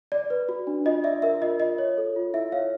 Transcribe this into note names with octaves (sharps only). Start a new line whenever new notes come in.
D5
B4
F#4
D4
F4 D#5
D5 E5
A#4 E5
F4 D#5
F4 D#5
C#5
A4
F4
E4 E5
C#5 F5